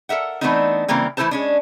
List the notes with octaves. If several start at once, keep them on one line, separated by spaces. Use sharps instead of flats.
A4 A#4 E5 F#5
E3 A3 B3 C4 D4 D#4
C#3 E3 G3 A#3 C4
E3 A3 E4 A4 C5 A5
G#3 C#4 D4